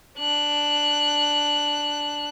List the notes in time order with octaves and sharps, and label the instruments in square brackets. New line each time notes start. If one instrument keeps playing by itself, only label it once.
[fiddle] D4 F#6